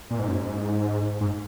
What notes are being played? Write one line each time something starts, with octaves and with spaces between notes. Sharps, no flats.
A#2
G#2
F#2
G#2
G#2